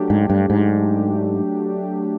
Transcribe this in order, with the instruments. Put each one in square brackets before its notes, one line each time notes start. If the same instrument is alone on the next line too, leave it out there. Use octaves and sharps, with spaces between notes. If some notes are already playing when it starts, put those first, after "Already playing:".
Already playing: [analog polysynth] F#3 A3 D4 G4
[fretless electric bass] G#2
G2
G#2